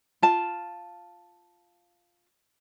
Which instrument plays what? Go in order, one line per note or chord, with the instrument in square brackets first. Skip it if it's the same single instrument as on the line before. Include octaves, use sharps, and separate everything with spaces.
[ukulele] F4 A5